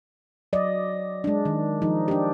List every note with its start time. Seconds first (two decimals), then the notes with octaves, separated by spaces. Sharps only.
0.53 F#3 D5 D#5
1.24 G#3 D4
1.45 D#3
1.82 F3 D#4
2.08 D4 G4